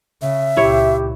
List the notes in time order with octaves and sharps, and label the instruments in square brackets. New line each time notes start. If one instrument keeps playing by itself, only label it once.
[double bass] C#3 [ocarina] E5
[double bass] C#2 A#2 [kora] E4 C#5 [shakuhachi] G4